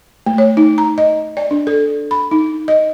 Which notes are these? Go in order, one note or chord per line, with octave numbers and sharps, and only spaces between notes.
A3
C#5
D#4
A#5
D#5
D5
D4
A4
B5
D#4
D#5